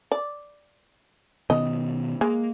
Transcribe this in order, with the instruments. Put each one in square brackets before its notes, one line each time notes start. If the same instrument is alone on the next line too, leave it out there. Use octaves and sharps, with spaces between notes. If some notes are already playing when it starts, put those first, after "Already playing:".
[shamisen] D5
[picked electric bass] B2 D#3 B3 [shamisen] D#5
[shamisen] G#3 [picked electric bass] A#3